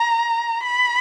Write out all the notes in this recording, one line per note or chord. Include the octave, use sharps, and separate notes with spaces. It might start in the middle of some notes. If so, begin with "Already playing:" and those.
Already playing: A#5
B5